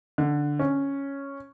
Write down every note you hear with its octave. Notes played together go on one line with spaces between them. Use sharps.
D3
C#4